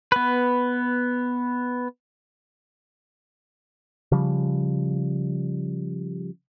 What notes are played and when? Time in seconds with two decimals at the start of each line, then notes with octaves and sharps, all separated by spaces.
0.12 B3 B4
4.12 C#3 F3 G3